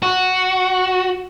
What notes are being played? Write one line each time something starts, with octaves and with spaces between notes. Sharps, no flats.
F#4